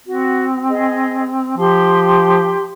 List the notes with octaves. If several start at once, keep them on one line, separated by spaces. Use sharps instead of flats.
C4 F#4
G#4 D#5
F3 G4 C6